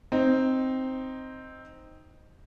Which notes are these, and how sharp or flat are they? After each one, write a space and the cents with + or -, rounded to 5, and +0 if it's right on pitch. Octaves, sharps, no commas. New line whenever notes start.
C4 +0 D#4 +0